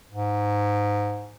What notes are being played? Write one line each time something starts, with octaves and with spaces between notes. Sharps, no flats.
G#2